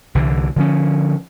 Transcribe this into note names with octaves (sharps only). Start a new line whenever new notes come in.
C2 D3 E3
D3 F3 C#4